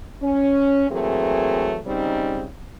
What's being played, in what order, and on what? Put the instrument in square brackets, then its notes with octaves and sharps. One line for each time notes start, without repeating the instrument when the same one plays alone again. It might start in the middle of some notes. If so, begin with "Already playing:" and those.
[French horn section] C#4
E3 F#3 A3 A#3 C4 G#4
C#3 G3 C4 C#4 D#4